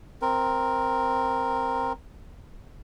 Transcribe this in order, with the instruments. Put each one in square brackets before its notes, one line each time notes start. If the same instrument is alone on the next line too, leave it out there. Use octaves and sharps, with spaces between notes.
[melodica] C4 A#4